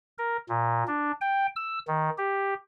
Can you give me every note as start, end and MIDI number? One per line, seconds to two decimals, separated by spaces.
0.18 0.37 70
0.49 0.84 46
0.88 1.12 62
1.21 1.47 79
1.56 1.79 88
1.88 2.10 51
2.18 2.54 67